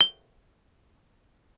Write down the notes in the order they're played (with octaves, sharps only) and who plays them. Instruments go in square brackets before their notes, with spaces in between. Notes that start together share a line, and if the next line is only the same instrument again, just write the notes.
[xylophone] G7